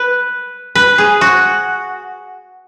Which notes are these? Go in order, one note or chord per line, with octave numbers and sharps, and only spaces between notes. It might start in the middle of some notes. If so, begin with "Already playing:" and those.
Already playing: B4
B4
G#4
F#4